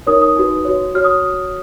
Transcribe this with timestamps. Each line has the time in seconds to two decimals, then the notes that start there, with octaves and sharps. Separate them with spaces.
0.07 D#4 A#4 C#5 D#6
0.22 D#6
0.36 D#4 F#4 B4
0.65 F#4 C#5
0.95 F#4 C#5 F6
1.04 D#6